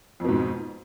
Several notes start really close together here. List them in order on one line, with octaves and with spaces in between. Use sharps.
F2 B2 G#2